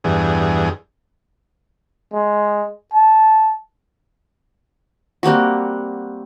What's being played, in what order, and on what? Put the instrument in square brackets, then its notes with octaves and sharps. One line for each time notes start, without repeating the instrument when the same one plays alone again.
[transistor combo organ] E2 G2 G#4
[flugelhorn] G#3
A5
[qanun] G3 A#3 C4 F#4